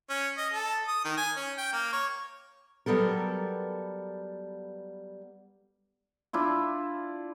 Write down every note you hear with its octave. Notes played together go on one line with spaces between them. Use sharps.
C#4
D#5
A4
D#6
D#3
G#5
C#4
G5
A#3
C#5
F#3 G3 B3 A4 A#4
D4 E4 F4